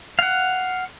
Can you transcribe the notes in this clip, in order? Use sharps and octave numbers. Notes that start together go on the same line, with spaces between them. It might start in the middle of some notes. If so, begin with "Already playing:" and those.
F5 F#5